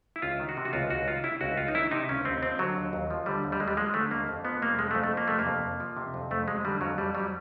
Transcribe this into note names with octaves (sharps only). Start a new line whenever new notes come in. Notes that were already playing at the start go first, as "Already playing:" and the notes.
E4
C#2 F4
D#3
F#4
C3
F#4
C#2 F4
C#2 F#4
D#3 F4
C3 E4
C#2 F#4
C#2 F4
D#4
D#3 E4
C3 D#4
C#2 C#4
D#2 C4
F3 C4
D3 F#3
D#2
D#2
F3
D3 G3
D#2
G3
D#2 G#3
G3
F3 G#3
D3 A3
D#2 A#3
F2
F3 B3
C3 A#3
F2 G#3
A3
F2
A3
F3
A#3
C3 A3
A#3
F2
F2
F3
C3
F2
F2 A3
F#3 G#3
D3 G3
F2 F#3
F2 G3
F#3 G3